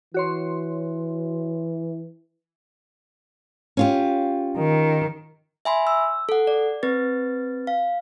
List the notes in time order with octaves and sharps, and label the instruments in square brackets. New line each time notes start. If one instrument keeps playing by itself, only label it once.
[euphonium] E3 [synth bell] F#4 C#5 C6
[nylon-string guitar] C#4 F4 G4
[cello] D#3
[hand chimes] E5 G#5 B5 C6
E6
A4 F#5
D5
C4 B4 A6
F5